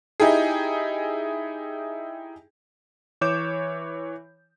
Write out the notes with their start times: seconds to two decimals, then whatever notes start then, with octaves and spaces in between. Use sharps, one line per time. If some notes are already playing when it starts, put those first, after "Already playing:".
0.20 D#4 E4 G4 G#4
3.21 E3 C#5 D6 G6 E7